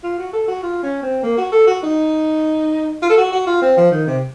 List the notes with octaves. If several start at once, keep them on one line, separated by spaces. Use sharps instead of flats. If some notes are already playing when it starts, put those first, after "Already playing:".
F4
F#4
A4
F#4
F4
C#4
C4
A#3
F#4
A4
F#4
D#4
F4
A4
F#4
F#4
F4
C4
F3
D#3
C3